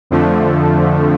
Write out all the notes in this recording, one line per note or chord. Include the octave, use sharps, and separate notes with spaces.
F2 D3 F3 A3